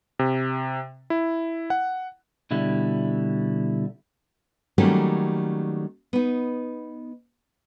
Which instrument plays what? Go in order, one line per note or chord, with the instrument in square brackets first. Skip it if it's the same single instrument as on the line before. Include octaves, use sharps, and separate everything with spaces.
[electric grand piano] C3
E4
F#5
[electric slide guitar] B2 D3 G3 E4
[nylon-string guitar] D#3 F#3 G3 A3 A#3 C#4
B3 D#4